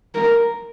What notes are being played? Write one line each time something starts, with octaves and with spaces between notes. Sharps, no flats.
A#4